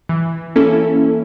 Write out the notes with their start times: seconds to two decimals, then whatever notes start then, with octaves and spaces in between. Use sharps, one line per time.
0.09 E3
0.56 A#3 C#4 E4 A4